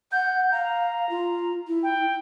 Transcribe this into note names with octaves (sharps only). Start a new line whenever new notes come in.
F#5 G6
F5 A#5
F4
E4
G5